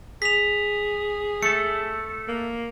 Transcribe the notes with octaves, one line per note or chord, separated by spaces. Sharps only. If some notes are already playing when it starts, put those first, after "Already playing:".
G#4 B6 F7
A3 A4 C#7
A#3